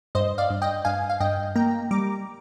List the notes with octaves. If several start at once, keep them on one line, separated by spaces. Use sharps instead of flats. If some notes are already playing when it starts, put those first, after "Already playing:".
G2 C5 D#5
D5 F5
G2
D#5 G5
G2 F5 G#5
F5
G2 D#5 G5
A#3 G5 A#5
G3 A#5 D6